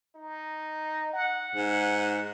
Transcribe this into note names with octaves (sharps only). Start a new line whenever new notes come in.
D#4
F#5
G#2